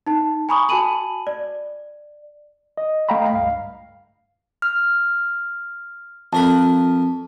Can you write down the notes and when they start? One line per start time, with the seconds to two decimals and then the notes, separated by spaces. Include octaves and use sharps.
0.07 D#4 A5
0.49 G#5 A#5 B5 C#6 D#6
0.69 F#4 G#5 A5 B5 D#7 F#7
1.27 D5
2.77 D#5
3.09 A3 D#5 F5 G5 A#5 B5
3.33 C#2 G2 F5
4.62 F6
6.33 F2 A#4 A5 B5